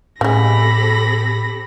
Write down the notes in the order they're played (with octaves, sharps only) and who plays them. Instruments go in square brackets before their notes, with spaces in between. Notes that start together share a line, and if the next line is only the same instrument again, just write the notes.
[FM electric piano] A2 [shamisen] C#3 G#3 [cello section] C4 G4 A4 [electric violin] B5 A#6